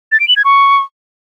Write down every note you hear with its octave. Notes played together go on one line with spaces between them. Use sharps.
A6
D7
F#7
G#6
C#6